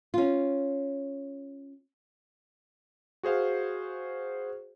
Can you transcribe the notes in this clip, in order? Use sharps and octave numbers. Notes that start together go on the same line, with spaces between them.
C#4 F4
F#4 G#4 C5 F5